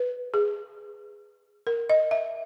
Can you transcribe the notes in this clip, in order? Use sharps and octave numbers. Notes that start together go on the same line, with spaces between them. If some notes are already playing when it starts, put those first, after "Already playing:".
Already playing: B4
G#4
A#4
D#5
E5